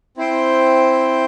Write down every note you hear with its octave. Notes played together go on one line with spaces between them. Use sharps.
C4 E4 C5 G5